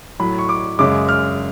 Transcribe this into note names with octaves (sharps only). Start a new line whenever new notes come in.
A2 F#3 B5
C#6
D6
F#2 C#3 G#3 D6
F6